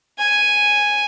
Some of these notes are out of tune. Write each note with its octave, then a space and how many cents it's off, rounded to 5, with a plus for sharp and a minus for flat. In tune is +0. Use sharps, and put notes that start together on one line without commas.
G#5 +0